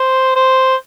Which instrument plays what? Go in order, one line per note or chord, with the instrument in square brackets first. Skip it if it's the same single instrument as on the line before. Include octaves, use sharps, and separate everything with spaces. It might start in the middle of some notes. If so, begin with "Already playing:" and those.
Already playing: [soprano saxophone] C5
C5